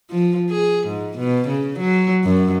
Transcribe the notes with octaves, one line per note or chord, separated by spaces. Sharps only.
F3
G#4
G#2
B2
C#3
F#3
F#2